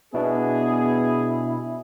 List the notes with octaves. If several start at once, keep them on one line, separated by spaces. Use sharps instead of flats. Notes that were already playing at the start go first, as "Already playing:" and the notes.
B2 B3 D4 E4 G#4